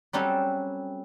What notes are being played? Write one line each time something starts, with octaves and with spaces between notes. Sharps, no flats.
F#3 G3 C4 C#4 F#4 A4